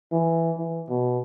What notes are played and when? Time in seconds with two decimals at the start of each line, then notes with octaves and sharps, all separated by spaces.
0.12 E3
0.58 E3
0.90 B2